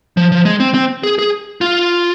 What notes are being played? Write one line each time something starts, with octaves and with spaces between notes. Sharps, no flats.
F3
F3
G#3
C4
C4
G#4
G#4
F4